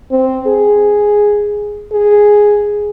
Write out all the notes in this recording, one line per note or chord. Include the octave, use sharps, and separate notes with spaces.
C4
G#4
G#4